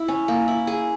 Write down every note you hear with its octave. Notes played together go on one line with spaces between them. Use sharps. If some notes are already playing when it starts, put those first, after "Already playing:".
Already playing: E4
C#4
A#3
E4
G#4